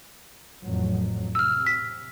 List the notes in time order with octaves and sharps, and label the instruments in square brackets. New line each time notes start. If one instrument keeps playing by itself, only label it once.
[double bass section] A1 F2 F#3
[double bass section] C3 [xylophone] E6 F6
[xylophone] B6